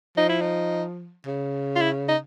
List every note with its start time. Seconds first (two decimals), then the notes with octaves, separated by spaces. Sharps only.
0.17 F3 D#4
0.29 E4
0.41 D#4
1.27 C#3
1.76 F4
1.81 E4
2.08 D#4